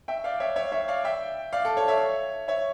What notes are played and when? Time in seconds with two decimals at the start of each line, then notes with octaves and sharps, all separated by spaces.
0.08 E5 G5
0.24 D5 F5
0.40 C#5 E5
0.56 C#5 E5
0.72 C#5 E5
0.88 D5 F5
1.04 E5 G5
1.53 D5 F5
1.65 A4
1.77 A4 C#5
1.88 C#5 E5
2.48 C#5 E5